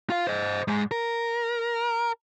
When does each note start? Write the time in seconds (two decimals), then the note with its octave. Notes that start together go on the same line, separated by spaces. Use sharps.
0.10 F4 F5
0.27 C5 D#5
0.68 G#2 G#3
0.91 A#4